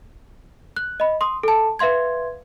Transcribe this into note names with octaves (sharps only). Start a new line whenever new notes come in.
F#6
D#5 B5
C6 D#6
A4 A5
B4 E5 F5 C6 G#6